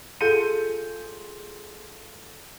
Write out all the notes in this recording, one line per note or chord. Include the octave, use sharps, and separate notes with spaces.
F4 G#4 A4 G6 C#7 D#7